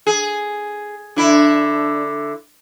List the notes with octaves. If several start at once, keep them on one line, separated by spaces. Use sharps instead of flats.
G#4
D3 D4 E4